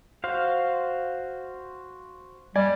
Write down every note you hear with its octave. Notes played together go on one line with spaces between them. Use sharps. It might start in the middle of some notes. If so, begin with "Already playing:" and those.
F#4 C5 F5
G3 D5 G#5